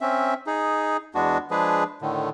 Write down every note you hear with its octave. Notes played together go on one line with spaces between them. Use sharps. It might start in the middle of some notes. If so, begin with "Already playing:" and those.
C4 C#4 E5
D#4 G#4
E2 G#3 B3 D4 F#4
F3 G#3 D4 G#4 B4
A2 D3 D#3